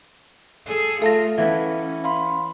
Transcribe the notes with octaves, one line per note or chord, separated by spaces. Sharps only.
G#4 A4
A3 F4 A4 E5 A5 A#6
E3 B3 C#4 E4 F5
F5 B5 C6